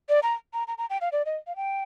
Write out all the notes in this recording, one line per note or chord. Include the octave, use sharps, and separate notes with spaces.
D5
A#5
A#5
A#5
A#5
G5
F5
D5
D#5
F5
G5